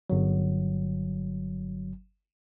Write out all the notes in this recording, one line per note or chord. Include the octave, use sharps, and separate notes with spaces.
G1 F#3